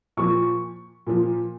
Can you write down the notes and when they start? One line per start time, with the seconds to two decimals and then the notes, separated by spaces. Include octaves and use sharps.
0.17 A#2 F3 C#6
1.07 A#2 F3